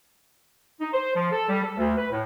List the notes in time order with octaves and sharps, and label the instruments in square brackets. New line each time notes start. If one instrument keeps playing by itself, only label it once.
[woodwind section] D#4
C5
F3
A4
G3
A4
D2
B4
A2